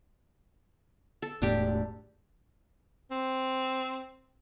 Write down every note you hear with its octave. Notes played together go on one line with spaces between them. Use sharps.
A4
E1 A2 D4 G4
C4